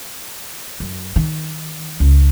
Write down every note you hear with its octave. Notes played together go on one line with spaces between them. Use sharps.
F#2
D#3
C#2